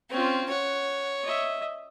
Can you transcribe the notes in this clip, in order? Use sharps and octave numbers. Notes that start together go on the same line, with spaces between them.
C4 C#4 F4
C#5 F#5
D#5 E5